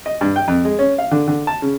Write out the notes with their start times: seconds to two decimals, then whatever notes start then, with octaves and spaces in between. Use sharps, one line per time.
0.06 D#5
0.21 G2
0.36 G5
0.48 F2
0.65 G#3
0.79 C#4
0.98 F5
1.11 D3
1.28 D3
1.47 A5
1.62 C#3